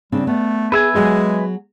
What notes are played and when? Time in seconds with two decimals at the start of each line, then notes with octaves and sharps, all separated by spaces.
0.12 C#3 G3 C4 D4
0.27 A3 B3
0.72 G#4 B4 E5 G#5
0.95 F#3 G#3 F#4 G#4